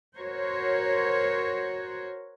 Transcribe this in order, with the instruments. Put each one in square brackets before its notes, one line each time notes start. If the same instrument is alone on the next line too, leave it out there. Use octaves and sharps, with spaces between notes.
[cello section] F#4 A#4 C5 C#5